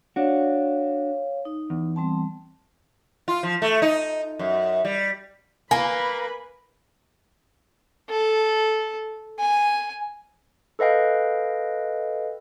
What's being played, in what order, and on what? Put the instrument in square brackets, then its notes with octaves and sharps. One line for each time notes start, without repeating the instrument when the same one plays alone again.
[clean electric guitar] D4 F#4 [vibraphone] C#5 F5
[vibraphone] D#4
[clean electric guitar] E2
[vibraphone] G3 C4 A5
[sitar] F4
F3
A3
D#4
F#2
G3
[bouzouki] A#3 [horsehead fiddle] B4 B5 [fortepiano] G#5
[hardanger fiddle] A4
G#5
[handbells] A4 B4 D#5 F5 G5